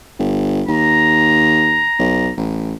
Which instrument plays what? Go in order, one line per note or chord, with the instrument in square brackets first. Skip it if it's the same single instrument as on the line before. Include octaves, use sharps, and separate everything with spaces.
[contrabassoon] G1
[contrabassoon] D#2 [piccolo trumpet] A#5
[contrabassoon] B1
A1